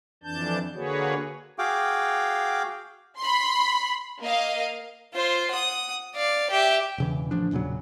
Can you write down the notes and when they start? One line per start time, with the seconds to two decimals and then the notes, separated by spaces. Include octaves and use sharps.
0.24 F2 E3 D4 A5 G6
0.75 D3 A#3 F#4 G#4 B4 C#5
1.59 F#4 G#4 F5 G5 D6
3.19 B5 C6
4.21 A#3 D#5 F5
5.14 F4 C5
5.50 F#5 D#6
6.15 D5 F5
6.50 G4 E5
6.98 E1 C#3 E3
7.31 A1 F3 D4
7.52 E1 A#2 C#3 F#3